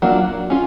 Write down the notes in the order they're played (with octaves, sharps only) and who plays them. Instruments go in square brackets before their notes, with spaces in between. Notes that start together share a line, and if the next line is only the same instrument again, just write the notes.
[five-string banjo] F#3 A#3 D4 F4
C#4 F4